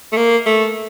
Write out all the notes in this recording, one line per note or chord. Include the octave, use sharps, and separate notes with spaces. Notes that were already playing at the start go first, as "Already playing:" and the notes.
A3
A#3
A3